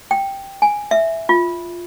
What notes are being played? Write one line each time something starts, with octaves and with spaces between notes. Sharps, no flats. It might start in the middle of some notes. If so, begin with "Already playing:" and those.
G5
G#5
E5
F4